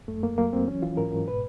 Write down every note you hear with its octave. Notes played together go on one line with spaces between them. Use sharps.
F#2 A3
F#2 A#3
F#3 A#3
F#3 C4
E3 C#4
E3 F4
G#2 A#4
G#2
B2 B4